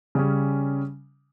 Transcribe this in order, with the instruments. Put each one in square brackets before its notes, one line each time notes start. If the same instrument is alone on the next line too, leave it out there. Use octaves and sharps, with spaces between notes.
[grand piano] C#3 G3 C#4